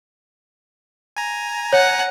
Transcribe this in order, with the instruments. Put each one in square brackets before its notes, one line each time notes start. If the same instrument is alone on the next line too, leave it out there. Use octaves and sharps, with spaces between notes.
[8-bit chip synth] G#5 A#5
[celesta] C#5 [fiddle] F#5